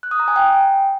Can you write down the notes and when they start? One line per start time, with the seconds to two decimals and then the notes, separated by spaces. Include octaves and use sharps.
0.03 F#6
0.11 D#6
0.20 A#5
0.28 G#5
0.36 G5